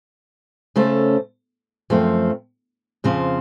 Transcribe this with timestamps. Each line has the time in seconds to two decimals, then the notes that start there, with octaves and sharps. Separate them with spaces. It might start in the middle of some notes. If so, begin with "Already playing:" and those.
0.76 C#3 A3 C#4 A4 C5
1.90 F#2 F3 A3 C4
3.04 F2 C#3 F3 C4